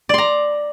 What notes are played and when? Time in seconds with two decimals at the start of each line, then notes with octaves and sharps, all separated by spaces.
0.09 D5
0.14 C6
0.18 A#5